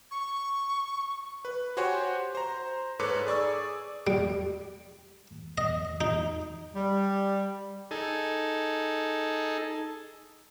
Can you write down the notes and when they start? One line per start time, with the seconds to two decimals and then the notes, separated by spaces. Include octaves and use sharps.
0.11 C#6
1.45 B4
1.77 F#4 G4 C5 C#5 F#5 G#5
2.35 C5 A#5
2.99 G#2 A4 B4 C#5 D6 C#7
3.27 G#4 D5 C#6 E6
4.07 G3
5.58 D#5
6.01 D#4
6.75 G3
7.91 D#4 G#4 A4